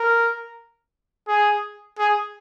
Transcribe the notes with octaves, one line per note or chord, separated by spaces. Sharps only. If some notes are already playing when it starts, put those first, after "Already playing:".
Already playing: A#4
G#4
G#4